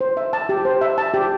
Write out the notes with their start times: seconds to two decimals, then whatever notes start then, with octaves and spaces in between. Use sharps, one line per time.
0.01 C5
0.17 E5
0.33 A5
0.49 G4
0.65 C5
0.81 E5
0.98 A5
1.14 G4